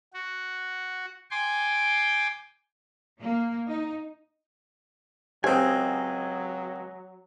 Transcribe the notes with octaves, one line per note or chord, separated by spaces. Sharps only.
F#4
G5 G#5 C6 D6
A#3
D#4
C#2 F#3 C4 G4 C5 D#5 G#5